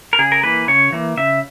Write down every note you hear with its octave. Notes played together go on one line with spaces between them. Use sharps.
A#4
C#3 G#4
A#4
E3 A#3 B4
C#3 C#5
E3 A#3
C#3 E5